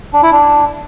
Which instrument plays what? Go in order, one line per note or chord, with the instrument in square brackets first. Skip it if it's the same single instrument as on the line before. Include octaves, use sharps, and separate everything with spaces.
[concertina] D4
E4
D4